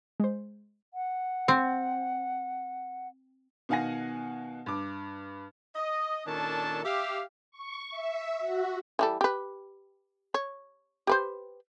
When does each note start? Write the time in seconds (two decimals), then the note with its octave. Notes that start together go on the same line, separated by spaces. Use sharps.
0.20 G#3 C5
0.94 F#5
1.48 C4
3.69 B2 D#3 F5 F#5 G#5 A#6
4.66 G2 D6
5.76 D#5
6.27 A#2 D#3 C#4 D4 A4 A5
6.84 G4 E5 F5
7.51 C#6
7.91 E5
8.39 F#4
8.99 E3 G3 A4
9.21 G4 B4
10.34 C#5
11.07 G4 B4 C5